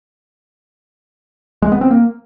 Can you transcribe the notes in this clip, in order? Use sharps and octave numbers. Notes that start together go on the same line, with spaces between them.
G#3
B3
C4
A#3